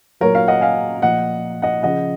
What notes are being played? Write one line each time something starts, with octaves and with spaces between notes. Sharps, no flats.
A#2 F#3 A#4 C#5
C#5 F5
D#5 F#5
F5 G#5
A#2 F3 D#5 F#5
D#5 F#5
C#3 F3 D#5 F#5